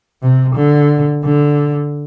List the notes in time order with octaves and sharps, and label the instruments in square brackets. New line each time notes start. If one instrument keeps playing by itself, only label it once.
[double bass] C3
D3
D3